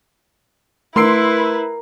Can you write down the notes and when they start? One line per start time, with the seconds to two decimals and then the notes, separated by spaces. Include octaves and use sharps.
0.96 A3 E4 A#4 B4 C6 E6 C7 D7